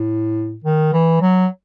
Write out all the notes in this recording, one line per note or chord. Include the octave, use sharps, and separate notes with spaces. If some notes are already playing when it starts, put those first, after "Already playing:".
Already playing: A2
D#3
E3
F#3